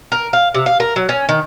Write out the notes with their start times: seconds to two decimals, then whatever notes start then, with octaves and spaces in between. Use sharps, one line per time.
0.12 A#4
0.33 F5
0.54 C3
0.66 F5
0.80 A#4
0.96 F#3
1.09 C#4
1.29 D#3